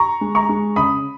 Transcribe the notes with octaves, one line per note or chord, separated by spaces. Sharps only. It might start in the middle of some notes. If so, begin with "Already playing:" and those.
Already playing: A#5 C#6
G#3
A#5 C#6
G#3
C#3 B5 D#6